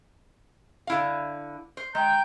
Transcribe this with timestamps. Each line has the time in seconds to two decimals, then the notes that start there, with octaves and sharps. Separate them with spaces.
0.87 D3 E4 F5
1.77 C5
1.95 G#3 G5 A#5 G6